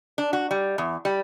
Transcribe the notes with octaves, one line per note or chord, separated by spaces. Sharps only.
D4
F#4
G3
E2
G3